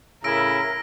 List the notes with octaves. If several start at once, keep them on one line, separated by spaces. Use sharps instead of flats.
A2 C#3 E4 A#4 E6 A#6 D7